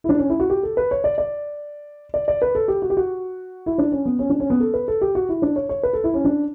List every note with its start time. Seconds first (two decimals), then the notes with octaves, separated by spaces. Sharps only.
0.04 E4
0.09 D4
0.19 C#4
0.29 E4
0.40 F#4
0.50 G4
0.63 A4
0.77 B4
0.91 C#5
1.04 D5
1.18 D5
2.14 D5
2.28 D5
2.42 B4
2.55 A4
2.68 G4
2.82 F#4
2.90 G4
2.97 F#4
3.66 E4
3.78 D4
3.92 C#4
4.06 B3
4.19 C#4
4.29 D4
4.40 C#4
4.50 B3
4.60 A4
4.74 B4
4.88 A4
5.01 G4
5.15 F#4
5.29 E4
5.42 D4
5.56 C#5
5.69 C#5
5.83 B4
5.93 A4
6.04 E4
6.14 C#4
6.25 D4